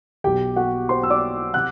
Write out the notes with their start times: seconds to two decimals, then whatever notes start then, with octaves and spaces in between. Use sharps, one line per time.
0.24 B1 B2 F#3 G4 G5
0.56 F#4 F#5
0.89 C5 C6
1.03 E6
1.10 D5 D6
1.54 C3 F#5 F#6